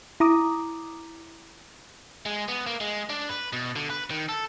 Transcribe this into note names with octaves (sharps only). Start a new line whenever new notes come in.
E4 A#5 D6 D#6
G#3
B3
A#3
G#3
D4
B4
B2
D3
B4
D#3
A4